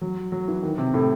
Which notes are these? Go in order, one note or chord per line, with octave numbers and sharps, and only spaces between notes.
F#3
F#3
E3
D#3
C3
A2